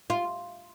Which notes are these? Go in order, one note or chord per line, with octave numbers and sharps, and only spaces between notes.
F4